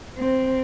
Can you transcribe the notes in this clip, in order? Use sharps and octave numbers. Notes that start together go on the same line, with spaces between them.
C4